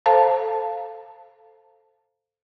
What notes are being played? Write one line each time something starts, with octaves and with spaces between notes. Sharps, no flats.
A4 C5 F5 A5 A#5